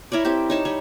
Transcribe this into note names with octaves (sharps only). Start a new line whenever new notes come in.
E4 A#4 C#5 D5
C4 E4 G4
D#4 C#5 A5
G3 C#5